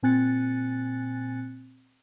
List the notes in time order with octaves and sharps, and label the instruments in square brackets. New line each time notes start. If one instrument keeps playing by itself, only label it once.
[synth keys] A#2 C4 G#5 F#6 A6 C#7